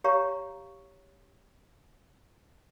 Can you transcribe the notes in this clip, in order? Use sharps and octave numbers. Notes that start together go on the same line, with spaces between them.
G4 C#5 F5 A#5 C#6